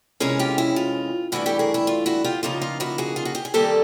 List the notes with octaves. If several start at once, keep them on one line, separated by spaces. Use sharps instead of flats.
F2 C3 E3 G#3 C#4 G#4 A#4
F4 G4
E4
F4
G2 E3 A3 D4 E4 F#4
G4 A4
G#4 A#4
E4
F4
E4 F#4
F4 G4
C#3 F3 A#3 D#4 F4
F4
E4 F#4
F#4 G#4
F4
F#4
G4
G#4
C3 D#3 G3 A#3 G4 A4